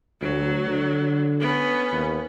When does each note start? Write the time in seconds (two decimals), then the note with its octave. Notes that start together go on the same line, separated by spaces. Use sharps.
0.22 D2 F#3
0.67 D3
1.41 B3 C#4
1.92 D#2